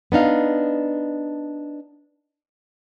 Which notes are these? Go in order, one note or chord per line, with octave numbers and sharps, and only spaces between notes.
B3 D4 D#4 F5